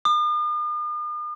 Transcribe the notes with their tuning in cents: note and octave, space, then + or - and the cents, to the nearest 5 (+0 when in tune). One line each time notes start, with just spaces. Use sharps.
D#6 -45